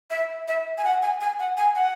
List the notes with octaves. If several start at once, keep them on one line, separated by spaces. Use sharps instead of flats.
E5
E5
G#5
F#5
G#5
G#5
F#5
G#5
F#5